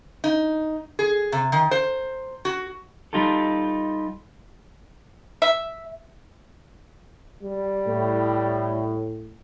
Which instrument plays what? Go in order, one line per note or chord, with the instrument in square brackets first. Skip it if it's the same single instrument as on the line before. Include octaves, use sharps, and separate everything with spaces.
[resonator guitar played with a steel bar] D#4
G#4
C3
D#3
C5
F#4
[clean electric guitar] G3 D#4 F4 G4 A4
[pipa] E5
[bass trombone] G3
[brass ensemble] A2